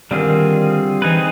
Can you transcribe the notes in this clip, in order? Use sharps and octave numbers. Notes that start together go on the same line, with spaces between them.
D3 D#3 G3 C4 F4 G#4
E3 C4 D#4 G#4 B4